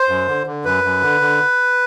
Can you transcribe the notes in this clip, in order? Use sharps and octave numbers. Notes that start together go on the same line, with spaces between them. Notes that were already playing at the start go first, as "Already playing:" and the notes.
Already playing: C5
F#2
D3
D3
F#2 B4
F#2
D3
D3